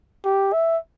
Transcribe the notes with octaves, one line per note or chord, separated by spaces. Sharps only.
G4
E5